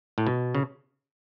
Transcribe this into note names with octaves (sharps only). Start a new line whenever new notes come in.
A2
B2
C#3